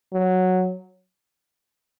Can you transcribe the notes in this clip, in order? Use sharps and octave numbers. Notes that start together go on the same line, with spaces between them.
F#3